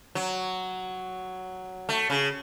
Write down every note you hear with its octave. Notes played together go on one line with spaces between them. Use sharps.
F#3
A3
C#3